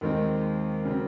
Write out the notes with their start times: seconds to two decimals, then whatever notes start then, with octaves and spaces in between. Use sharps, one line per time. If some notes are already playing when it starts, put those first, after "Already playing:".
0.01 D#2 D#3 G#3 C4
0.85 C#3 F#3 C4